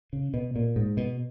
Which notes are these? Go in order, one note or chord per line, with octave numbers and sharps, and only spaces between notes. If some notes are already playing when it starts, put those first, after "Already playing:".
C#3
B2
A#2
G#2
B2